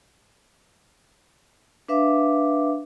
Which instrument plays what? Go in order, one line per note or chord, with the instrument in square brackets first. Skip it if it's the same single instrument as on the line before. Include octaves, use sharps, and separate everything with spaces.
[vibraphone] D4 B4 E5 F5 D6